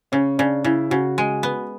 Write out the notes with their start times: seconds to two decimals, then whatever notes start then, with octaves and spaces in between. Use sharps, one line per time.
0.12 C#3 C#4
0.38 C#3 D4
0.64 C#3 E4
0.90 C#3 F#4
1.18 G#3
1.43 B3